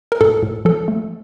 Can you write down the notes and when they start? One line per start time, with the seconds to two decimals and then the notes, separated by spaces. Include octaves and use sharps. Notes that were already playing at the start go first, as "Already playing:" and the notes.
0.12 A#4
0.21 A2 A4
0.43 A2
0.65 F3 A4
0.88 A3